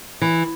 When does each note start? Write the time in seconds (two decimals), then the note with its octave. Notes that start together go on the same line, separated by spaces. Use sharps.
0.22 E3